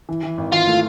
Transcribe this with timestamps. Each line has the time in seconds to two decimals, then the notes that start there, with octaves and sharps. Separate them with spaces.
0.09 E3
0.23 E3
0.38 G#1
0.53 E3 F4
0.67 A3